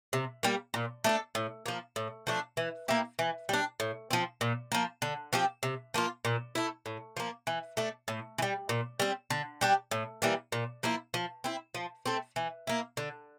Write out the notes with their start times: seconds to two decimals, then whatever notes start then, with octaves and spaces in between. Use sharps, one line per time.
0.13 C3
0.43 G3 A#3
0.74 A#2
1.04 A3 D4 A4
1.35 A2
1.66 F3 A#3
1.96 A2
2.27 F3 A3 D4
2.57 E3
2.88 A#3 E4 G4
3.19 E3
3.49 G3 D4
3.80 A2
4.11 F3 C4
4.41 A#2
4.72 F3 A#3
5.02 D3
5.33 F3 C4 G4
5.63 C3
5.94 F3 A#3 F4
6.25 A#2
6.55 A3 E4
6.86 A2
7.17 F3 A#3
7.47 E3
7.77 A3 D4 A4
8.08 A2
8.38 E3
8.42 G3
8.69 A#2
9.00 G3 C4
9.30 D3
9.61 G3 D4 G4
9.91 A2
10.22 E3 G3 A#3
10.52 A#2
10.83 F3 A#3 E4
11.14 F3
11.44 C4 E4
11.74 F3
12.06 A3 C4
12.36 E3
12.67 A#3 E4
12.97 D3